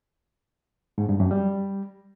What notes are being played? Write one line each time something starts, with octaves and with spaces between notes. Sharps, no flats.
G#2
G2
F#2
G3